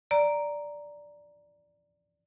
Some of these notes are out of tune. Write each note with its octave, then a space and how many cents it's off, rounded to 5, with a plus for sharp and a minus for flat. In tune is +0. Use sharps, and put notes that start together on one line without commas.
D5 +0 A#5 +0